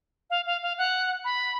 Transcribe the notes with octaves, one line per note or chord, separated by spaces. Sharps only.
F5
F5
F5
F#5
B5